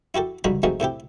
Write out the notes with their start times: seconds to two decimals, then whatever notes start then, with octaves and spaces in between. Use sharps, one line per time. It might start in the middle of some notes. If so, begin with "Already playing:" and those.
0.14 E4 F#4 G4 A4
0.44 C#2 G2 D3 D#4 F#4 B5
0.63 C3 G#3 A3 D#4 F#4
0.80 A2 C3 E4 G4